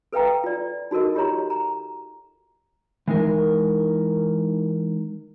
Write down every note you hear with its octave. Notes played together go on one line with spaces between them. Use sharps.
A4 B4 E5 F5 G5 A#5
F4 D5
D#4 F#4 A4 A#4 D#5
F4 G4 C#5 A#5 C6
A#5
E3 G#3 D#4 A#4